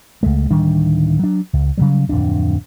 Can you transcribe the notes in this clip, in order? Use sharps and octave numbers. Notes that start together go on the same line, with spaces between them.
C#2 G#3 A3
D1 D#3 G3 D4
F#3 D4
C#2
C#3 F#3 G3
D1 F2 D4